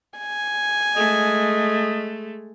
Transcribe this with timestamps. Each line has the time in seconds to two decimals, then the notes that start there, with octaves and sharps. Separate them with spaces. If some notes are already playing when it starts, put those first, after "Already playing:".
0.18 G#5
0.96 G#3 A3 D#5